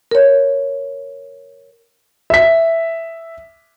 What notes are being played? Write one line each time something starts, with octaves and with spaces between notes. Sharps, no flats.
A#4 C#5
E5 B6